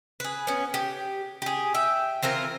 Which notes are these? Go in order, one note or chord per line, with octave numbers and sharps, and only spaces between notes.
G#4 B4
B3 C#4
G4
G4 G#4
E5 G5
E3 C4 F4 A#4